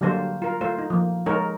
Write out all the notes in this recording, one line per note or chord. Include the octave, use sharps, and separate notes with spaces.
D3 F#3 G3 A#3 A4 C5
F4 A#4
A3 F4 C5
D#4
F3 A#3
G#3 D#4 A4 A#4 C#5